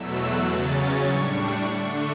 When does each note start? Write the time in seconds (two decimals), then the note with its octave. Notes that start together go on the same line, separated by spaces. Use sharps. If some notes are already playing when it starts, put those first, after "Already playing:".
Already playing: E2 B2 F#3 A3 E6
0.19 F#6
0.49 E2 C#3 F#3 C#4 A6
0.78 C#6
1.09 A2 G3 D4
1.67 D3 A3 D4 C#6